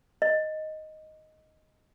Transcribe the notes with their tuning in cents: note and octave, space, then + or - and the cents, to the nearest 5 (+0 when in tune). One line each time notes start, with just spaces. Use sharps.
D#5 +0